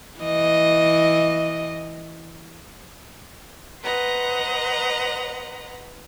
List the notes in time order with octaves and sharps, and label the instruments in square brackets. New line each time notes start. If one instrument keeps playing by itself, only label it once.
[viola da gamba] E3 D#5
[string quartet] B4 C5 D#5 F#5 A#5